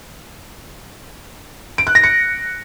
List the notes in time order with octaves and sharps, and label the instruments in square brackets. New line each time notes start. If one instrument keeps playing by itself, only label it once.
[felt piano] D7
F#6
A#6
C#7